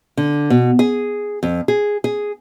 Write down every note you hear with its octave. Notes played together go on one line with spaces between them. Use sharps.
D3
B2
G#4
F2
G#4
G#4